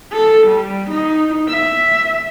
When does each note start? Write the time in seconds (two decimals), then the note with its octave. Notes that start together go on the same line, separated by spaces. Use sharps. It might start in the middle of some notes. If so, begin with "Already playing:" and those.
0.13 A4
0.48 G3
0.91 D#4
1.50 E5